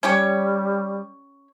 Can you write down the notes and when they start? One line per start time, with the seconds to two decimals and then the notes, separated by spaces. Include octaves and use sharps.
0.03 G3 C#4 G4 C#5